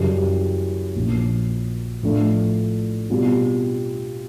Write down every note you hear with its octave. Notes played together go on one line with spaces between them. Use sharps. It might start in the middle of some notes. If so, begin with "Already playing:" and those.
Already playing: F#2 C#3 E3 G3
A#1 A#2 F3
A2 F3 A3 D4
B2 G3 C4 F4